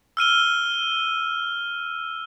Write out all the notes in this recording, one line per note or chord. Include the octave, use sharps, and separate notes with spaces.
E6 F6 D#7 G7